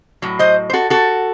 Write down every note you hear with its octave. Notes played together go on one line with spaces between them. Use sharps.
A2 F#3
C5 D#5
C5
F#4 A4
F#4 A4